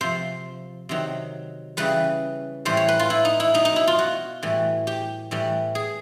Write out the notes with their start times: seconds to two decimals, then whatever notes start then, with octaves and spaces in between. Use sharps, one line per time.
0.01 C3 F3 C5
0.89 C3 D#3 F#3
1.77 C#3 E3 G3 B4
2.65 A2 E3 G3 C5
2.77 C#5
2.88 B4
2.99 F4
3.10 E4
3.25 D#4
3.40 E4
3.54 B2 F#3 D#4
3.65 D#4
3.76 E4
3.87 F4
3.99 F#4
4.43 A2 E3 G3
4.87 G4
5.31 A2 E3 G3
5.75 G#4